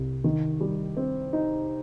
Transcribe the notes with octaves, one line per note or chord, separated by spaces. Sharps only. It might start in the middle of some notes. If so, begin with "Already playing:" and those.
Already playing: C2
D#3
G3
C4
D#4